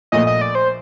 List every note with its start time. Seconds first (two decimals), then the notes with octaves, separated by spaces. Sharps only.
0.12 A#1 A#2 A3 D#5
0.27 D#5
0.41 D5
0.55 C5